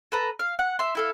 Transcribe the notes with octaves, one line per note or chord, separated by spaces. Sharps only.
A4 B4 A#5
F5
F#5
E5 C6
E4 A4 F5